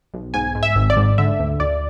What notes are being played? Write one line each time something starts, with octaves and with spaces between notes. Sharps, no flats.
B1
G#2 G#5
G#2
E5
G#1
D5
G#2
D3 E5
D2
D2 D5